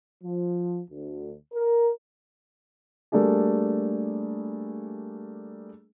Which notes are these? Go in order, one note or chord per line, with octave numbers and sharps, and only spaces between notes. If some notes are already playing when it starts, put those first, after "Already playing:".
F3
D2
A#4
G3 A3 A#3 D4 G#4